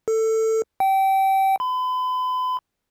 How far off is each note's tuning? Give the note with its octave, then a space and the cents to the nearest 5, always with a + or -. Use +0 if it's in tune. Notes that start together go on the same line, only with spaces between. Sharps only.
A4 +15
G5 -25
B5 +40